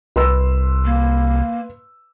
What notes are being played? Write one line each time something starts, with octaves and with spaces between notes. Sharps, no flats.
C2 B4 C6 E6
A#3